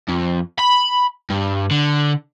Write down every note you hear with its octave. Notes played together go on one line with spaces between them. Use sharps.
F2
B5
G2
D3